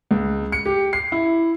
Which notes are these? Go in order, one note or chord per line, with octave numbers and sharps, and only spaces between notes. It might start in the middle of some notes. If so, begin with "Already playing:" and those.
C#2
C#7
G4
C7
E4